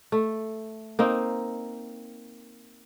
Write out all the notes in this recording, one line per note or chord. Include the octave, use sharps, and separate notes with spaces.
A3
A#3 C4 D#4